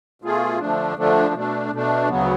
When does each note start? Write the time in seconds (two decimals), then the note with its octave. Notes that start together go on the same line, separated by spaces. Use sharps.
0.22 B2 A3 F4 G#4
0.60 D3 F3 A3 D4
0.96 D3 F3 A3 D4
1.34 B2 A3 D4
1.72 B2 A3 D4
2.09 D2 C#3 F#3 B3